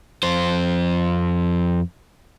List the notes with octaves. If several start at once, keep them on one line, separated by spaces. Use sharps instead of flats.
F2 C5